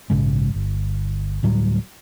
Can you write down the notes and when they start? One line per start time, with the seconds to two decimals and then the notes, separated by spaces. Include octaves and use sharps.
0.10 A#1 G#2 C#3 G#3
0.54 G1
1.43 D2 A2 F#3 G3